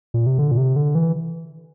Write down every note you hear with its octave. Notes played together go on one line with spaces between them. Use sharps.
A#2
C3
D3
A#2
C3
D3
E3